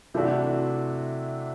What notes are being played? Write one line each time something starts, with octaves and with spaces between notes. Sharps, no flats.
C3 E3 A3 D4 F#4